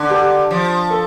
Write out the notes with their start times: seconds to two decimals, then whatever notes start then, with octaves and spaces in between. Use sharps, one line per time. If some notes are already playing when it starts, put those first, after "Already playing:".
Already playing: D3
0.10 G4
0.51 F3
0.90 A4